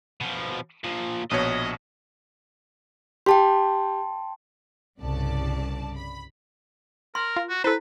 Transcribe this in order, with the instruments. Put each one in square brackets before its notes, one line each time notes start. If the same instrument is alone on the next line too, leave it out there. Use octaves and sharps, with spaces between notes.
[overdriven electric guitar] B2 F3
A#2 F3
[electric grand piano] A#1 B2 C#5 [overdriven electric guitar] D#5
[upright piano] G4 [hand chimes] G5 A5 C6
[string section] C2 G2 C#3 D5 A5
B5
[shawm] A#4 [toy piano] C6
[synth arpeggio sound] F4
[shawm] F#4
[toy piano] E4 [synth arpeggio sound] A4 C5 [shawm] B4